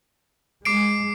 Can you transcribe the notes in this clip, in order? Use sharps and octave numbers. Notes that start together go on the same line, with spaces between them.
G#3 D6 C7 D7